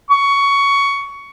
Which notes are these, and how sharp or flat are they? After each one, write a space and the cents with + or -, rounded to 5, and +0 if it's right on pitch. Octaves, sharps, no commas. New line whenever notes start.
C#6 +15